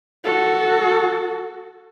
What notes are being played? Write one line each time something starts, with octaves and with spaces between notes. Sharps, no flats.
F#4 A4